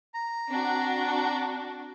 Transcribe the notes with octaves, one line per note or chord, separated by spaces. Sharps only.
A#5
C4 D4 F#4